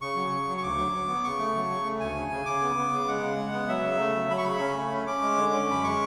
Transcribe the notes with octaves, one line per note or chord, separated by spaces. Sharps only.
C#3 C#6
F#3
C#3
F#3
C#6
D2 D6
F#3
F#3
B3
C#3 C#6
A3
F#3
C#3
A3
D2 G#5
C#3
C#3
C#3 D6
B3
B3
C#3
G#3 F#5
C#3
G#3
B3
F#3 E5
C#3
A3
F#3
F#3 B5
C#6
C#3 B5
C#4
A3
C#4
C#4 D6
G#3
D3
C#4
F#2 B5
G#3 C#6